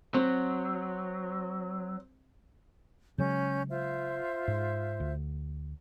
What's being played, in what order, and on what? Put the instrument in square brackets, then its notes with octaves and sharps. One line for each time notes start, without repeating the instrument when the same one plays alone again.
[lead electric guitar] F#3 [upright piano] C4
[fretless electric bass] C#3 F#3 G#3 [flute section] C#4 G6
[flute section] F4 C5 E5
[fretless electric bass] G#2
D2